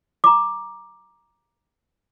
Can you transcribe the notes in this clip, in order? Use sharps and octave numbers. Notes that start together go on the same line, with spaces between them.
A#5 D6